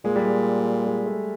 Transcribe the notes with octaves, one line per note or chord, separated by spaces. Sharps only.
A#2 G#3
G3
G#3
G#3
A3